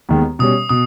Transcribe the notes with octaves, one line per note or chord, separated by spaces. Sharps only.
D#2 D#3 G#3 B3
B2 G3 C#4 D#6
B2 D#6